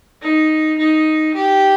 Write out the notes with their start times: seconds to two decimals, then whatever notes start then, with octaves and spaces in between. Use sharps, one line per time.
0.22 D#4
0.78 D#4
1.34 G4